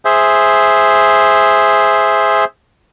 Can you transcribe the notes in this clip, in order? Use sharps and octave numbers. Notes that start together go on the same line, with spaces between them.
G#4 C5 E5